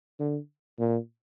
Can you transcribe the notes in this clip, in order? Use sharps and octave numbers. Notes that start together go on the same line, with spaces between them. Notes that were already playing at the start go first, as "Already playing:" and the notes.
D3
A#2